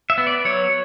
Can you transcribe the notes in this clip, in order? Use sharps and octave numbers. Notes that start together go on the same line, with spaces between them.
E5
B3
D5
F#3 C#5